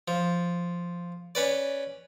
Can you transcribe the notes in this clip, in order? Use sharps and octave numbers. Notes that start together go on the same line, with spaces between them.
F3
C#4 B4 D5